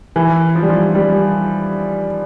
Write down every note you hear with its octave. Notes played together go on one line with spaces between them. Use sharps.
E3
F3
G3
F3
G3